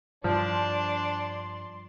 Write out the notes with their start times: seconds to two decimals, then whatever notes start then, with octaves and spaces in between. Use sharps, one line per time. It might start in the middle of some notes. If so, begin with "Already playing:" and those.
0.24 G2 F3 D4 D5 C6